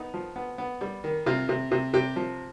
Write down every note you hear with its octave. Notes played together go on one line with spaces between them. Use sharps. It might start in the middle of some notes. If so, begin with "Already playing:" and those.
Already playing: B3 D#4
F3
B3
B3
G3
D#3
C3 F4
C3
C3
C3 G4
F3